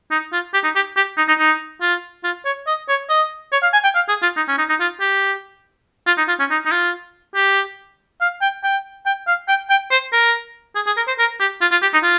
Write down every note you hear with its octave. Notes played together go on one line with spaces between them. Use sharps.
D#4
F4
G4
D#4
G4
G4
D#4
D#4
D#4
F4
F4
C#5
D#5
C#5
D#5
C#5
F5
G#5
G5
F5
G#4
F4
D#4
C#4
D#4
D#4
F4
G4
F4
D#4
F4
C#4
D#4
D#4
F4
G4
F5
G5
G5
G5
F5
G5
G5
C5
A#4
G#4
G#4
A#4
C5
A#4
G4
F4
F4
G4
D#4
F4